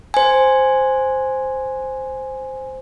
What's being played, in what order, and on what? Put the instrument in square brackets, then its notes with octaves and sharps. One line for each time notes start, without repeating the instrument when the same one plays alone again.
[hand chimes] C5 G#5